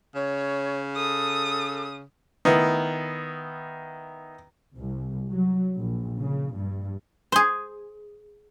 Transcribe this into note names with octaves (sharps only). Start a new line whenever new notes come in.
C#3 C#5
A4 D#6
D#3 B3 E4
C2
F#3
A#1
C#3
G2
G#4 C5